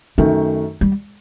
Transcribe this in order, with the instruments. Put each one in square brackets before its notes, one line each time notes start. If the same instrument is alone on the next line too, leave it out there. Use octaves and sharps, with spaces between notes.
[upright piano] F#2 D#3 A3 [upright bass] D3
[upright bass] G3